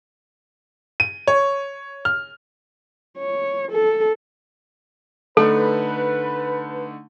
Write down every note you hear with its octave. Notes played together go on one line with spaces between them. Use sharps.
D#7
C#5
F6
C#5
A4
D3 A3 D#4 A4 B4